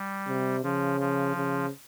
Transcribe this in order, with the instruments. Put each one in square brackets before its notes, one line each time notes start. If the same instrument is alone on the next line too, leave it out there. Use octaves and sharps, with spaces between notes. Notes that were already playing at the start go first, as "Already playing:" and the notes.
Already playing: [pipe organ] G3
[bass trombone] C3
[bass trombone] C#3 [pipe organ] F3
[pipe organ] F3
[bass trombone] C#3